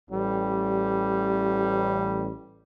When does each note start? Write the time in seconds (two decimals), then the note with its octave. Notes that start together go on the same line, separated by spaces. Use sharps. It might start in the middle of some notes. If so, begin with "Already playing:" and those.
0.10 A1 G3